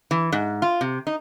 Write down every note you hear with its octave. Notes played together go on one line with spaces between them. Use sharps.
E3
G#2
F4
C3
D#4